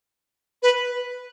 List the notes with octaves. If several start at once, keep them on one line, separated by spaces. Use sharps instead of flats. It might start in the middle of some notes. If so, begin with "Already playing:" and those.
B4